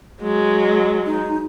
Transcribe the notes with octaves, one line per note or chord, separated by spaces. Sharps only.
F#3 G#3
D#4